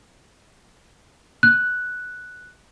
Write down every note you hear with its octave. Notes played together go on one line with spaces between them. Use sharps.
F#6